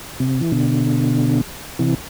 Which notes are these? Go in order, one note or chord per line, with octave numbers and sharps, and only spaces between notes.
C3
E3
B2 D3
C3 E3